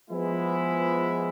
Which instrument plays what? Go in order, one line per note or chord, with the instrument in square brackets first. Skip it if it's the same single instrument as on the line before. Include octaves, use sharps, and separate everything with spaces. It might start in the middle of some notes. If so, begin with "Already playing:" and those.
[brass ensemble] F3 G#3 B3 E4